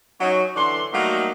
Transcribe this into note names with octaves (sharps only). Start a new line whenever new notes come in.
F#3 C#4 D#4
D3 E3 D5 C6
F#3 G3 A3 A#3 D#4 F#4